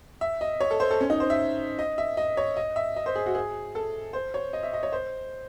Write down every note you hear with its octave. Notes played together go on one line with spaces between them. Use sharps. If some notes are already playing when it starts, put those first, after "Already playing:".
E5
D#5
C#5
A4
C5
A4
C#4
D#4
C5
E5
D#5
E5
D#5
C#5
D#5
E5
D#5
C5
G#4
F#4
G#4
A4
C5
C#5
D#5
E5
D#5
C#5
C5